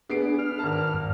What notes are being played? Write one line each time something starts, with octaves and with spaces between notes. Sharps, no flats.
B3 D4 G#4 C7 D7
F6
G#1 A#4 A5
G2